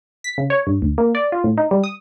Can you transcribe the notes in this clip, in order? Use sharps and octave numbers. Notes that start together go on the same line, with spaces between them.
B6
C#3
C#5
G2
D2
A#3
D5
F4
A2
D#4
G3
D#6